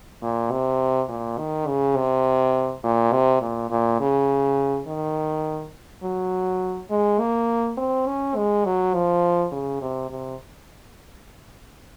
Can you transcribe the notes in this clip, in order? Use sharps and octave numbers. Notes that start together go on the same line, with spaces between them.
A#2
C3
A#2
D#3
C#3
C3
A#2
C3
A#2
A#2
C#3
D#3
F#3
G#3
A#3
C4
C#4
G#3
F#3
F3
C#3
C3
C3